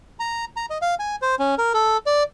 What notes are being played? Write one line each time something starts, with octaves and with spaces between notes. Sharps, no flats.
A#5
A#5
D#5
F5
G#5
C5
C#4
A#4
A4
D5